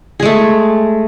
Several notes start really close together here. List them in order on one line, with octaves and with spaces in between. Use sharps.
G#4 G#3 A3